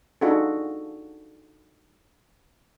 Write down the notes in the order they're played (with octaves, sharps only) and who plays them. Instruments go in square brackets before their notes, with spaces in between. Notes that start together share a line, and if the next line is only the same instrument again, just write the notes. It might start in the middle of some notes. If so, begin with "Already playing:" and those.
[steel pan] D4 D#4 F4 F#4 G#4 A4